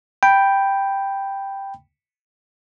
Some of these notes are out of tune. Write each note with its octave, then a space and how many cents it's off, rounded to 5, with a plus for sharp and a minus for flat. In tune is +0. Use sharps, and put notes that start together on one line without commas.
G5 +0 B5 +0